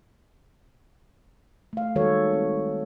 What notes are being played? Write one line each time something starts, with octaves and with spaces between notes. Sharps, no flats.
A3 F5
D#3 G3 G#3 F#4 A4 C#5
C4